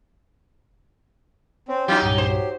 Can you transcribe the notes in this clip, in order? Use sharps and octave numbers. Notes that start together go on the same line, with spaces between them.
C4 C#4
F#3 D#4 F4 G4 G5
C2 G2 A#2 G4
C5
F#3